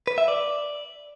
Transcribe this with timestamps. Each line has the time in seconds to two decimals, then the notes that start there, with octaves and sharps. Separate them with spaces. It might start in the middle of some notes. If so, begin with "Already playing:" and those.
0.07 B4
0.18 E5
0.28 D5